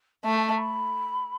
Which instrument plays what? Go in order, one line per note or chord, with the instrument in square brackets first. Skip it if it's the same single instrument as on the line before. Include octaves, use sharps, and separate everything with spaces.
[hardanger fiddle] A3 [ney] A5
[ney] A5
A5
B5